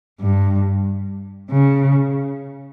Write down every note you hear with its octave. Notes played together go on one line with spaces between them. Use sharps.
G2
C#3